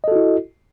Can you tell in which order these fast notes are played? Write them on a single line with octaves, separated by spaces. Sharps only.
D#5 A4 F#4 E4